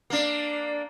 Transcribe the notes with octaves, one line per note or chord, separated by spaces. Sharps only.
A#3 D4